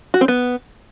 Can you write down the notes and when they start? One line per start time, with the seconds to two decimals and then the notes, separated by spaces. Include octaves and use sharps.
0.14 F#4
0.21 C4
0.28 B3